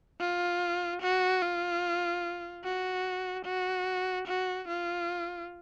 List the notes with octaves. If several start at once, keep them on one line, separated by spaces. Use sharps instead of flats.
F4
F#4
F4
F#4
F#4
F#4
F4